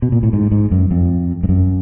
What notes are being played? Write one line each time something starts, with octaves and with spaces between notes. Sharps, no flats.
B2
A#2
A2
G#2
G#2
F#2
F2
G2
F#2